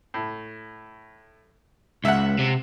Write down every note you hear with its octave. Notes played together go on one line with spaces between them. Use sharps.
A2
C#2 E5 F#5
C3